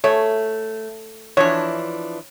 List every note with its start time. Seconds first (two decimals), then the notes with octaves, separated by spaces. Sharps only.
0.04 A3 C#5
1.37 E3 F3 D4 C#5